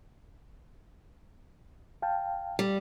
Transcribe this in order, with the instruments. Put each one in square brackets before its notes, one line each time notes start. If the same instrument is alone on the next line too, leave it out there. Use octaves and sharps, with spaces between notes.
[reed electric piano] F5 G5 A5
[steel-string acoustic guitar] G3